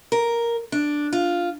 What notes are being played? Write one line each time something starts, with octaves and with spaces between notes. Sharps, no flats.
A#4
D4
F4